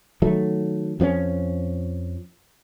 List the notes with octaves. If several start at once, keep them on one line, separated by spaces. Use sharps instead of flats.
D#3 F#3 A3
F2 F3 A#3 C#4